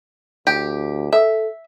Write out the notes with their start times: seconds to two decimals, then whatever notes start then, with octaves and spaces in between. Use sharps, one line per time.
0.47 D2 G4
1.13 A4 E5